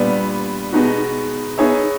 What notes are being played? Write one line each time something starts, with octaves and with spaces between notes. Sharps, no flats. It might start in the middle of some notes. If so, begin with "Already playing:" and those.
Already playing: A#2 G3 B3 D4
B2 G#3 B3 D#4 F#4
B3 D#4 G#4 C#5 E5